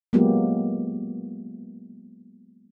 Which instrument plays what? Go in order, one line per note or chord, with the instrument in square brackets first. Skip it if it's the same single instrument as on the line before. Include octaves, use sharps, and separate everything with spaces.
[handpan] F#3 G#3 A#3 B3 F4 G4